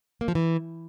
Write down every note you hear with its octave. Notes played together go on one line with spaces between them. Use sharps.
A#3
F3
E3